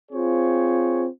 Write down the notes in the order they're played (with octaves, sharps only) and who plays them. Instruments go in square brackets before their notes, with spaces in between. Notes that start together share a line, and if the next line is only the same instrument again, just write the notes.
[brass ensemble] C4 F4 G#4 C5 C#5